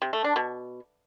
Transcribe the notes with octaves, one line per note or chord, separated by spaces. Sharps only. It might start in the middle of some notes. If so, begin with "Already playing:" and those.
C3
A3
D4
B2